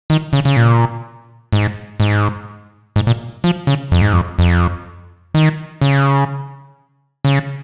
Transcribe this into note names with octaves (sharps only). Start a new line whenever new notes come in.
D#3
C#3
C#3
A#2
G#2
G#2
G#2
A#2
F3
C#3
F2
G#2
F2
F2
D#3
C#3
C#3